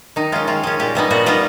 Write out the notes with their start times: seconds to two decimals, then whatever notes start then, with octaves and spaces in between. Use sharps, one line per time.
0.16 D#3 D#4
0.32 G#3 C#4 F4
0.47 D#3 F4
0.63 G#3 C#4
0.80 A#2 G4
0.95 G3 B3 D#4
1.10 A#2 F#4
1.26 G3 B3 D#4 F4